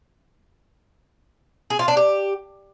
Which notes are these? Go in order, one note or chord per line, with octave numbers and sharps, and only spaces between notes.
G#4
F4
D4
G4